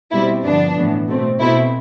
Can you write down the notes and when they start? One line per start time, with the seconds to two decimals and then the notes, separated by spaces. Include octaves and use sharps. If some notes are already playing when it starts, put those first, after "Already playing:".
0.12 B2 G3 C4 E4
0.44 G2 D3 F3 B3 D4
0.76 A2 E3 B3
1.08 B2 A3 C4
1.40 B2 A3 C4 E4